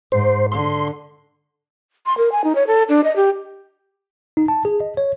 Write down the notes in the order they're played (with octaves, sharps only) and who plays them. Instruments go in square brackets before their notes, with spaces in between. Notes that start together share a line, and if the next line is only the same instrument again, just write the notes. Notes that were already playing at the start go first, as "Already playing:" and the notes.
[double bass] G#2 [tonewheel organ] C5
[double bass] D3 [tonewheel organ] C6
[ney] C6
A#4
G#5
D#4
C#5
A4
D4
D#5
G4
[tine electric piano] D#4
A5
G#4
D#5
C#5